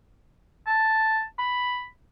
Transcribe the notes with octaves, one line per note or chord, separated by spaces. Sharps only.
A5
B5